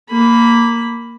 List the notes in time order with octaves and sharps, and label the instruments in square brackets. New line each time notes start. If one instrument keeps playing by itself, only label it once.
[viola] A#3 B5